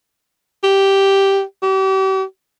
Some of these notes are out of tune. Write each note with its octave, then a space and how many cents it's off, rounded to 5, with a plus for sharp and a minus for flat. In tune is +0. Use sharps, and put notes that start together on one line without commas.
G4 -5
G4 -40